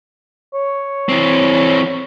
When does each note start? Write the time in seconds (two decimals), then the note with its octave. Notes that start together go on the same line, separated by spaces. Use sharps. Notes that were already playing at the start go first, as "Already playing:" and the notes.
0.54 C#5
1.09 E3 C4